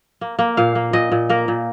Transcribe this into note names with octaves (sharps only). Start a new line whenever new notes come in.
A#3
A#3
A#2 F5
A#3
A#2 D#5
A#2
A#3 A#4
A#2